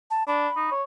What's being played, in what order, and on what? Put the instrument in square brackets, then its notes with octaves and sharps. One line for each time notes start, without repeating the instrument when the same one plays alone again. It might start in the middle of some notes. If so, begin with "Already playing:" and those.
[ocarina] A5
[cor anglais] D4 [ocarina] B5
[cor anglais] D#4
C#5